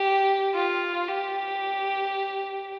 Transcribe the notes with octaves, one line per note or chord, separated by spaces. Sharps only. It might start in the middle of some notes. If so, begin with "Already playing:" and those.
Already playing: G4
F4
G4